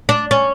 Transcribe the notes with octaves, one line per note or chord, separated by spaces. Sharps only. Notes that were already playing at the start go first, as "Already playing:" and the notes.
D4
C#4